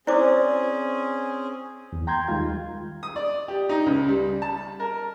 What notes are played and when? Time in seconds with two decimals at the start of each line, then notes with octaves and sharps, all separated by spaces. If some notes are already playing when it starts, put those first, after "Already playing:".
0.07 C4 C#4 E4 G#4 C5 D5 D6
1.93 E2
2.07 G5 A#5 C6 G6 G#6
2.28 D#2 D#3 G3 G#3 F4 G#6
3.03 D#6
3.16 D5
3.48 G4
3.69 D#4
3.86 C#2
4.08 G3
4.42 A5
4.80 A#4